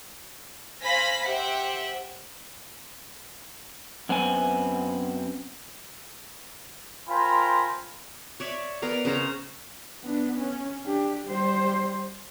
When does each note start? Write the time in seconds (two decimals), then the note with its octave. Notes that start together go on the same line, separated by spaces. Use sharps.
0.83 C5 F5 G#5 B5 A#6 B6
1.26 G4 C5 E5 F#5 G5
4.09 F#2 B3 C4 G#5
7.08 F4 A#4 C5 G5 G#5 B5
8.40 C#5 D5 E5
8.82 B3 A#4 D5 F5
9.05 C#3 C#4 C5 A#5
10.03 B3 D4
10.38 C#4
10.85 D4 G4
11.27 G3 C5